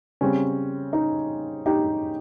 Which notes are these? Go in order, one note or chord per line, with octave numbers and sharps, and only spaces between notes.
C#3 G3 C4 C#4
D#4
D#4 G4